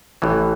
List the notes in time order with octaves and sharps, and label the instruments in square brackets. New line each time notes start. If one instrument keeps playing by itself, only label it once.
[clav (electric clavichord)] A1 A2 E3